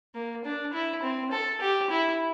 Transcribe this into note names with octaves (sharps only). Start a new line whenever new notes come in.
A#3
D4
E4
C4
A4
G4
E4